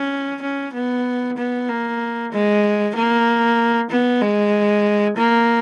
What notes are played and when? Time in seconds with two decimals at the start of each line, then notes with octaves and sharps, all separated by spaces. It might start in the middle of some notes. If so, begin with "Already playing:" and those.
Already playing: C#4
0.42 C#4
0.74 B3
1.37 B3
1.69 A#3
2.32 G#3
2.95 A#3
3.90 B3
4.21 G#3
5.16 A#3